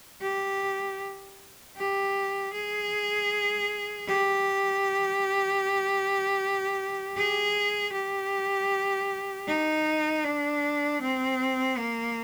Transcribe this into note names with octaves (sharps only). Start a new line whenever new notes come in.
G4
G4
G#4
G4
G#4
G4
D#4
D4
C4
A#3